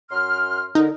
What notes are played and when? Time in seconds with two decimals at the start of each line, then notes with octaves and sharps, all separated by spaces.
0.10 F#2 C6 F6
0.75 D3 D#4 A#4